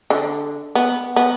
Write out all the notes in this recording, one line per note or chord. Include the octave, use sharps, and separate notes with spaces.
D3
B3
B3